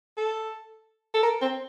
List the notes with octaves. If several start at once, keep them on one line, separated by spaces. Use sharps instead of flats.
A4
A4
A#4
C4